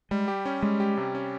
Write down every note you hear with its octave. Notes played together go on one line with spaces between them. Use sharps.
G3 G#3
G4
C#4
G3 G#3
G4
C3
C#4